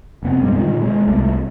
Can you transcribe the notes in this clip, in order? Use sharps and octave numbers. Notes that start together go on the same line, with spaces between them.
F1 B3 C4
C2 G2 G3 G#3
A#2 D3 D#3
B2 G#3
C2 G3 A3